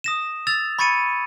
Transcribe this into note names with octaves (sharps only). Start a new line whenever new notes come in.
D#6 A#6 E7
E6 A6 F7
B5 C#6 G#6 A6 C#7 D#7